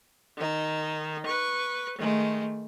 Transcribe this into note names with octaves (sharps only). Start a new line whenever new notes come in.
D#3 D#4
B4 C#6
D#3 G#3 A3